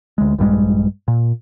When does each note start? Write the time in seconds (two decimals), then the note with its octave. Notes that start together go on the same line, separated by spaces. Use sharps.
0.18 D2 G#3
0.38 A#1 G2 G3 G#3
1.08 A#2